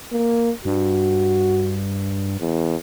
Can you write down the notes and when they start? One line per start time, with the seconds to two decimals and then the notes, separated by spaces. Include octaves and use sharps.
0.12 A#3
0.65 G2 F#4
2.41 E2